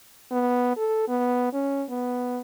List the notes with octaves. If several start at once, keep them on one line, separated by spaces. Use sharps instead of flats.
B3
A4
B3
C#4
B3